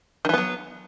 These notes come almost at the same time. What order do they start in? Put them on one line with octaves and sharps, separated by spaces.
D#3 E3 B3 F#3